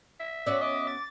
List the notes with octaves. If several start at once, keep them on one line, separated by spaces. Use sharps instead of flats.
E5
B3 C#4 F#4 D5 E6
D#5 D6
A6